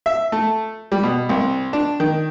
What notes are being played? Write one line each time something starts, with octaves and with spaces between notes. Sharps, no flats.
E5
A3
G3
B2
C2
D4
D#3